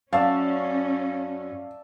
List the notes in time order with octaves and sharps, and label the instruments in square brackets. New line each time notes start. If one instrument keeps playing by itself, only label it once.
[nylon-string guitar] F#2 [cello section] C#4 [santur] D5 E5 A5 [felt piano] F5